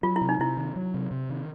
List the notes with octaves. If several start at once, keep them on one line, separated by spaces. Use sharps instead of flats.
F#3 F4
E4
C3
D#4
C3 E4
D#3
F#3
C3
C3
D#3